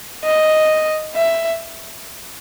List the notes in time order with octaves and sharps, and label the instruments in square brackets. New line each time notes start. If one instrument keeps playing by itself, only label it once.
[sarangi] D#5
E5